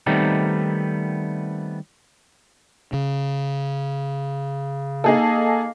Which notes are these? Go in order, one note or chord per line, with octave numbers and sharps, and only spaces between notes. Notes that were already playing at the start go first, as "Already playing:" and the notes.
D#3 G3 A3 B3 C4 D#4
C#3
A#3 D#4 G#4 A4